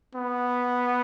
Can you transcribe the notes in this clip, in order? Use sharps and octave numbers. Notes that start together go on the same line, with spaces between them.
B3